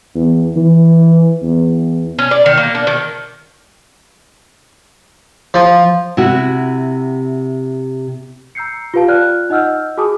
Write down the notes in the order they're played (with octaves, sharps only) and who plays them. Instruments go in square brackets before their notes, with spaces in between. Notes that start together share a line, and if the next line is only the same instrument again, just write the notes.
[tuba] E2
E3
E2
[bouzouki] C#4
D5
D#3
A#3
D4
D#3
[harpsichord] F3
[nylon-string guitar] C3 E4 F#4
[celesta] A#5 E6 G6 C7 C#7
F4 G4 B4 F5 A5
F4 D5 G5 F6 F#6
D#4 D#5 F#5 E6 F6 G6
F#4 G#4 G#5 A5 D6 D#6